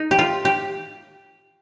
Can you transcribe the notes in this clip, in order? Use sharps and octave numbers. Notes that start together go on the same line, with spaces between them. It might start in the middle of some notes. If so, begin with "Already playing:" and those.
Already playing: D#4
G4
F4
G4